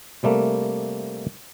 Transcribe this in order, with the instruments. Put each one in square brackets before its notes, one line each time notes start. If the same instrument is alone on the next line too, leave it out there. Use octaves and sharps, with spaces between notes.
[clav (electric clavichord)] C3 G3 A3 A#3